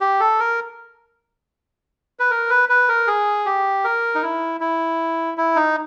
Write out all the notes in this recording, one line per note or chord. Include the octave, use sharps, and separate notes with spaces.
G4
A4
A#4
B4
A#4
B4
B4
A#4
G#4
G4
A#4
D#4
E4
E4
E4
D#4